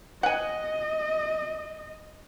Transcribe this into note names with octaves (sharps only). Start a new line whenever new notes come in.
D#5 F#5 G#5